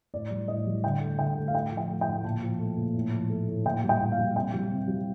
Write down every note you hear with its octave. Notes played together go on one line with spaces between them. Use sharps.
A2 D5
G3
A2 D#5
G3
D3 G5
A3
D3 G5
A3
F5
A2 G5
F3
G5
A3
G5
A2
A#2 A5
F3
A3
A#2
A2
F3
A3
A2
A#2 G5
G3
G5
A#2
F5
G3
C3 G5
G3
C3
G3